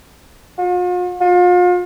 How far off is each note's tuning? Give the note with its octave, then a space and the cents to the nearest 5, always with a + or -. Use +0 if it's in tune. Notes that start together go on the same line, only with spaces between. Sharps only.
F4 +45
F4 +35